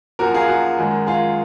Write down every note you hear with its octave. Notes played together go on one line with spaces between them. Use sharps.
F#2 F3 A#3 F#4 A#4
F4 G#4
F#4
F#2 D#3 G#3
F4 G#4